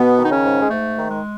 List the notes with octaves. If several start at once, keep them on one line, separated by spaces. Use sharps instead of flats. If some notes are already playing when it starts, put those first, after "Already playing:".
Already playing: B2 B3
D#3
D#4
C#3 C#4
G#2
G#3
G#2 A3
D#3
G#3